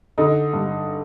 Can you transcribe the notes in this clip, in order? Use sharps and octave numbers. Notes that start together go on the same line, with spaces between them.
D3 D#4
G2